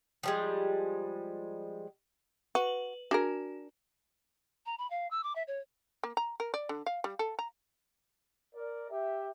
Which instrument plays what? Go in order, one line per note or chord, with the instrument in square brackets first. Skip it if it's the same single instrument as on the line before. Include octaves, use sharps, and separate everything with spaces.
[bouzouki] F3 G3 G#3
[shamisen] F#4 [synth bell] B4 F#7
[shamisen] D4 G#4 A#4 [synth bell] F#4
[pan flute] A#5
B5
F5
E6
D6
E5
C#5
[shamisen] A#3
A#5
A#4
D5
D3
F5
G3
A4
A#5
[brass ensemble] A#4 D5
G4 E5